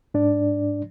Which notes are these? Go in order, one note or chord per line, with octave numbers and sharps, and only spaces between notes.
G#2 D4 D5